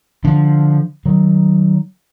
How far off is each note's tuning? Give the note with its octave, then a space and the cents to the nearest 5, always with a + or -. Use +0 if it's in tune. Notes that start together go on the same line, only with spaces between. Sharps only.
D3 +0 F3 +0 D4 +0
D#3 +0 F#3 +20